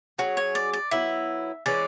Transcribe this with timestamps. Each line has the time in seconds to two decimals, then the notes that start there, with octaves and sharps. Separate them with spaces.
0.18 F#3 C#4 F#4 G#4
0.37 C#5
0.55 D5
0.73 D5
0.91 F#3 B3 E4 E5
1.66 E3 G#3 C#4 D5